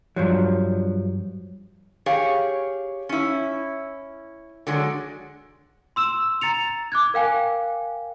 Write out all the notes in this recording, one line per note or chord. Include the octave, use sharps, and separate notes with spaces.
G2 F3 F#3
G4 G#4 C#5 F5
C#4 E4
D3 F#3 G#3
C6 E6 E7
A#5 A6 C#7 F7
D6 F#6 G#6
A#4 F5 G5 G#5